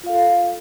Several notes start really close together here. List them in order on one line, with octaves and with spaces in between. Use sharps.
F4 F5 A4